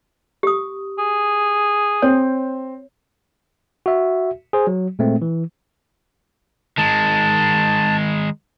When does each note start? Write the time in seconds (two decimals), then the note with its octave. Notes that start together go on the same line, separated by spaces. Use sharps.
0.43 G4 D#6
0.99 G#4
2.02 C4 C#5
3.86 F#4 E5
4.53 G#4 C5
4.67 F#3
4.99 A#2 G#3 A3 C4
5.22 E3
6.78 D#3 G#3 A5